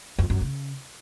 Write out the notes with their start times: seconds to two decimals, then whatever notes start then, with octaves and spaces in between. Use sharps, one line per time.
0.19 F2
0.30 F#2
0.41 C#3